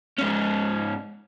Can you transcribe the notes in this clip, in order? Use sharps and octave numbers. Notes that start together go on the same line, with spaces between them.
G#2 C#4